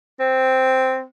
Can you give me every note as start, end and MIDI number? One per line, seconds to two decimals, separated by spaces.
0.20 1.04 60